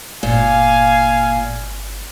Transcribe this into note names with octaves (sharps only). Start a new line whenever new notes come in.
G1 A#2 F5 G#5